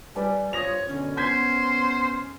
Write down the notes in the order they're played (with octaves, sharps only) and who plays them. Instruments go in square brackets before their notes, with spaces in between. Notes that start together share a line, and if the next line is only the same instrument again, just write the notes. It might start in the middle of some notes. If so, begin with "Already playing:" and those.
[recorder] G3 [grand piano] B4 D5 G#5
[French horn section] G2 F4 C5 [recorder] C#5 [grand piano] D#6 A#6 F7
[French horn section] F#2 B2 D3 [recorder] C#4
[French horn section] B3 [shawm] C5 [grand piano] G6 G#6 B6